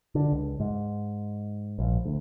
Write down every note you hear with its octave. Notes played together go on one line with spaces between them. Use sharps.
D3
C#2
G#2
A#1
D2